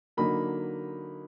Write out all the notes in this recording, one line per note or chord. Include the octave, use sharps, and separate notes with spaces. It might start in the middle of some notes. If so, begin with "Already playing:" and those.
D3 F#3 A#3 D#4 B5